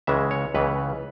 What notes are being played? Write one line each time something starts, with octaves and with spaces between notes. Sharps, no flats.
C#2 C#3 E3 G#3 E5
C#5
C#2 C#3 E3 B4